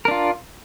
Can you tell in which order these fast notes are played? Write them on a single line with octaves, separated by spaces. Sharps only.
A#4 D4 F4